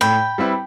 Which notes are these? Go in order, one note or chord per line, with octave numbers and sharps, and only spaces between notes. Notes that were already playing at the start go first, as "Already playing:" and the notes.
A2 G5 B5
G3 C4 E4 B4